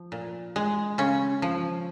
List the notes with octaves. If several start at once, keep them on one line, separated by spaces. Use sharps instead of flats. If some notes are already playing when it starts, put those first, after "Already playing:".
Already playing: F3
A#2
G#3
C#3 C#4
F3